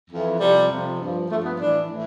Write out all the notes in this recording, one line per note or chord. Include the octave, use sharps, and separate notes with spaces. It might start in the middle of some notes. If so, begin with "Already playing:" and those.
F2 E3
F2 C3 F3 G3
F2 C3 F3
G2 F3
G2 F3 A3
B3
A2 E3 D4
A2 E3